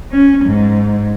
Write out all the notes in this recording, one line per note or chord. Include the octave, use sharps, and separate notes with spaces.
C#4
G#2